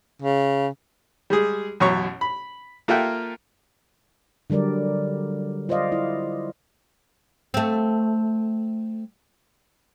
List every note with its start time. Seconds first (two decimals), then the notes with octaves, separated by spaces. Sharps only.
0.22 C#3
1.30 G3 G#3 G#4
1.80 A1 F#2 B2 C#5 A#5 C#6
2.21 B5
2.88 A#3 F4 A4 E5 F#5 G5
4.50 D3 F#3 G3 A#4 D5
5.69 F4 C5 D5 D#5 F5
5.92 E4
7.54 A3 C4